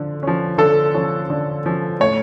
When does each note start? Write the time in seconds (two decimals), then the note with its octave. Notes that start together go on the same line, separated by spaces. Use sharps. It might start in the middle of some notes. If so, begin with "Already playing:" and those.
Already playing: D3 F3
0.23 F3 C#4
0.58 D3 A4
0.94 F3 C#4
1.30 D3
1.65 F3 C#4
2.00 A2 C#5